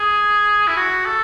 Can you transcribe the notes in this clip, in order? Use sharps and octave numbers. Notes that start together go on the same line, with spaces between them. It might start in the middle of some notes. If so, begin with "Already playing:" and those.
Already playing: G#4
E4
F#4
A4